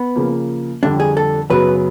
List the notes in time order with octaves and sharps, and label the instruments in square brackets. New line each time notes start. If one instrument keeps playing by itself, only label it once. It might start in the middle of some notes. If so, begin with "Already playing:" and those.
Already playing: [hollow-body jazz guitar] B3
[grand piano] C#3 F3 A#3
[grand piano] F2 D3 G3 [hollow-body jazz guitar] D4
[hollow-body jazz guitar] G#4
A4
[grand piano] F#2 C#3 F#3 B3 [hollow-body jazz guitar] B4